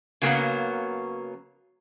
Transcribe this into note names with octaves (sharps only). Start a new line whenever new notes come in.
C#3 F#3 A#3 B3 C#4